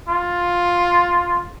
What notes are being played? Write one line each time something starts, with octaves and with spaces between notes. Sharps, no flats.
F4